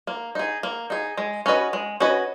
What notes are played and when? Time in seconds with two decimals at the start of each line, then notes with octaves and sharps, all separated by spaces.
0.07 A#3
0.35 D#4 G#4
0.63 A#3
0.90 D#4 G#4
1.17 G#3
1.46 C#4 F#4 B4 D#5
1.73 G#3
2.00 C#4 F#4 B4 D#5